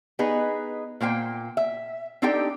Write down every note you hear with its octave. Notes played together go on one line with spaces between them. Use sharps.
B3 D#4 G#4 B4
A#2 A#3 C5 G5
E5
C4 D4 D#4 G4 A4 G5